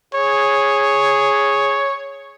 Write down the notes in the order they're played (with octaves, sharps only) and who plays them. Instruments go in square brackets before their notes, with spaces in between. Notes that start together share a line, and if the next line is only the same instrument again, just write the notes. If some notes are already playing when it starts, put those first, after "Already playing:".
[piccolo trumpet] G#4 [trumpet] C#5